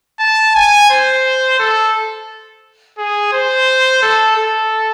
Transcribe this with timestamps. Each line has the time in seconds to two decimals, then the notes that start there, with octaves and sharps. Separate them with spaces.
0.20 A5
0.55 G#5
0.90 C5
1.59 A4
2.98 G#4
3.33 C5
4.02 A4
4.36 A4